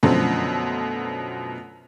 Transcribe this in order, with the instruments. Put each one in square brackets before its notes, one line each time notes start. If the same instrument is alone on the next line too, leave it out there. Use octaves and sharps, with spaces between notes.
[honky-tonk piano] F#2 B2 D3 F3 A3 C4